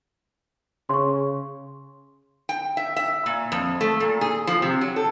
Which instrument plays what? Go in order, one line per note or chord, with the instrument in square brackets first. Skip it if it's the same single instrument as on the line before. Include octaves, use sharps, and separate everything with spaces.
[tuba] C#3 [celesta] C6 C#6
[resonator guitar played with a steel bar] G5
E5
E5
A#2
F2
A3
A#2
G#4
F3
C3
F#3
A4